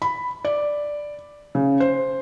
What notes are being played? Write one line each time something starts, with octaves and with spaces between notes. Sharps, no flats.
B5
D5
C#3
C5